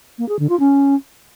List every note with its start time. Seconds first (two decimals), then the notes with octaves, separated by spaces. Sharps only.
0.18 A#3
0.29 G#4
0.39 D3
0.49 F4
0.60 C#4